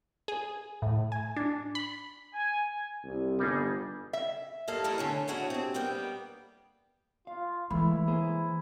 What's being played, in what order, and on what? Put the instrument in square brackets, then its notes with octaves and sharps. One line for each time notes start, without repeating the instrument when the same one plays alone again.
[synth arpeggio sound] G#4
A2
G#5
D4
B5
[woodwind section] G#5
[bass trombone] C2
[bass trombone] G1 [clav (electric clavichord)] G3 D#4 G#4
[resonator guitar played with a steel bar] E5
[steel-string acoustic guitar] G2 A#3 D#4 A4 F5
D#3 G3 A3 E4 A4 A#4
D3 A3 C#4
C#4 D4 E4 F#4 G#4
C4 G4
G3 A#3 B3 G5
[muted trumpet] F4 [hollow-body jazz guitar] F5
[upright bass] E3 [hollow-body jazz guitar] G#3 A3 [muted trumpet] E4 [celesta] B5
[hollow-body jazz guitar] A#3 G#4 C5